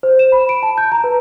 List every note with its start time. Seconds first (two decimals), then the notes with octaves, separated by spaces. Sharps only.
0.03 C5
0.19 E7
0.32 B5
0.49 D7
0.63 A5
0.78 G6
0.92 A#5
1.04 B4